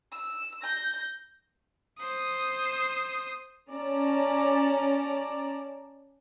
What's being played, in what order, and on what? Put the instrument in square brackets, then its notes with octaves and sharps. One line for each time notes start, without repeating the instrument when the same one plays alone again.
[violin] E6
G6 A#6
[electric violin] C5 D#6
[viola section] C#4 D5 A5 A#5